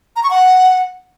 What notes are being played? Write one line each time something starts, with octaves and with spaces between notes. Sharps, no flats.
A#5
C#6
F#5